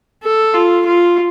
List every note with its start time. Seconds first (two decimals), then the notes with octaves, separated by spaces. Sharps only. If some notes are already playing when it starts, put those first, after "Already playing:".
0.24 A4
0.54 F4
0.86 F4